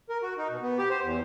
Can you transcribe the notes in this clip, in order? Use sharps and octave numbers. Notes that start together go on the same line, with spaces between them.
A#4
F#4
D#4
B2
B3
G4
C5
E2